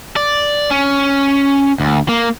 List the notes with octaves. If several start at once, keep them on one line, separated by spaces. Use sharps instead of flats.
D5
C#4
D2
A#3